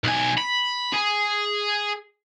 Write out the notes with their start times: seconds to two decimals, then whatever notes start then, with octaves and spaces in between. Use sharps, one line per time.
0.04 B1 G#5
0.37 B5
0.93 G#4